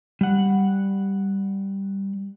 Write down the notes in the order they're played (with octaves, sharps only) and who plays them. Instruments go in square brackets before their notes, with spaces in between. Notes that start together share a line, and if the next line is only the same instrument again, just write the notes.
[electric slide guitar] G3 F#5